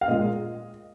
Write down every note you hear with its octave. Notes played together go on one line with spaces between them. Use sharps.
F5
A#2 G#3 D#5